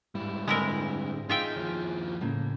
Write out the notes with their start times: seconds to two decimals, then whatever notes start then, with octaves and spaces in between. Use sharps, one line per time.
0.15 G#2 G3 E4
0.47 D3 G#3 C4 E4 A#4
1.29 D#4 F4 G#4 E5 G5
1.56 D#2 F3
2.21 A2 C#3 A#3